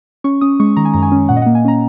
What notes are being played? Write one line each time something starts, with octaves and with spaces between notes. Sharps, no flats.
C#4 C#6
C#4 D#6
G#3 C#6
D#3 A#5
G#5
F#2 A#5
G#5
C#4
A#2 F#5
D#5
A#3 F#5
G#5
C#4 A#5